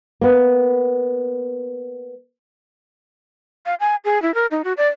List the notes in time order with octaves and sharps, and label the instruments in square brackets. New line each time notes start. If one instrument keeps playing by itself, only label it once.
[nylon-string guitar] A#3 B3
[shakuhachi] F5
G#5
G#4
E4
A#4
D#4
F#4
D5